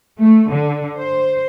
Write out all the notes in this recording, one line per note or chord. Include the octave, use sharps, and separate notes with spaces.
A3
D3
C5